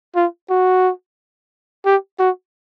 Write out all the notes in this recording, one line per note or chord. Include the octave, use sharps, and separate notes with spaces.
F4
F#4
G4
F#4